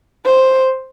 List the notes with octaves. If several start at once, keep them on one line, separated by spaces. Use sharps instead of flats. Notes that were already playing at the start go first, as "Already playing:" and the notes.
C5